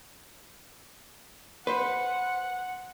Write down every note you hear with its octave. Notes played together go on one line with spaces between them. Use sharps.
B4 C5 F#5